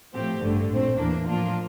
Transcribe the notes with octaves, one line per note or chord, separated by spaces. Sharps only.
A2 F3 A3 C4 G4
A1 G2 D3 A3
A#2 A3 C4
E2 E3 A#3 D4
A2 F3 A#3 D4 F4